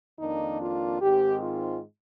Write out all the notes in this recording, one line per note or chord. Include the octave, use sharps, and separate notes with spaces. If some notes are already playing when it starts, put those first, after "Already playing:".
F2 D#3 A#3 D4 D#4
F4
G#2 D#3 G#3 C4 G4
F4